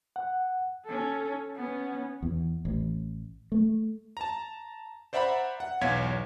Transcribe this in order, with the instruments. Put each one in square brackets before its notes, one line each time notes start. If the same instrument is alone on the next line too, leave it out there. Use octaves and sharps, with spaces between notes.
[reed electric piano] F#5
[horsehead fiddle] C#4 A4
B3 C#4
[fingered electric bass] E2
A1
A3
[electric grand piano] A5 A#5
C5 D5 E5 F#5 A#5 B5
F#5
B1 E2 C#5 F5 G#6 B6